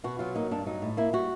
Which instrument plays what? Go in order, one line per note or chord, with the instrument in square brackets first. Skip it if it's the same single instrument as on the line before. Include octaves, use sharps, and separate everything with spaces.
[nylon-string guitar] B2 F#4
F#3 F4
A#3 D#4
G2 D4
F#3 D#4
A2
A#3 E4
G3 F#4